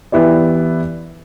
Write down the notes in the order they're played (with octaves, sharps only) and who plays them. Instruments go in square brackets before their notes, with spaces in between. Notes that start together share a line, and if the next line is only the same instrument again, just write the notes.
[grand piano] E3 B3 E4 G4 D5